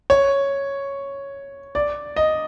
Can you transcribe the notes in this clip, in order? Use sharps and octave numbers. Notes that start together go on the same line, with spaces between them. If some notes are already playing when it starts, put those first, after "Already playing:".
C#5
D5
D#5